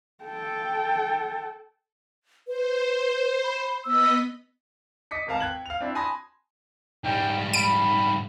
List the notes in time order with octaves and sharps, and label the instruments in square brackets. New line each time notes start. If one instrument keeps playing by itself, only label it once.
[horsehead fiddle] A4 G5
[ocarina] B4 [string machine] C5
[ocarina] B5
[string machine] B3 D#5 B5 [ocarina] E6
[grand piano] D#5 D6 B6 C#7
D1 G#1 A#4 F5 A5
G5 F#6 G#6 F#7
F5 F7
C4 D4 E4
G#5 A5 B5 C6 D#6 A#6
[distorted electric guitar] G#2 G3 [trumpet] G5
[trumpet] B5 [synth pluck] D7 D#7